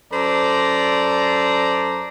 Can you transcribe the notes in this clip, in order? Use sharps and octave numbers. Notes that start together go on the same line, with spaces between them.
F#2 A4 C5 D5 A#5